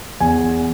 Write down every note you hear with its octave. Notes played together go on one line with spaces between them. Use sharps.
E2 G#5